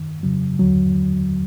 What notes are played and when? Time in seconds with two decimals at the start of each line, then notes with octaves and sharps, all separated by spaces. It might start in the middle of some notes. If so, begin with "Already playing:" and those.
Already playing: D#3
0.23 F2 C#3 F#3
0.59 D#2 D3 F#3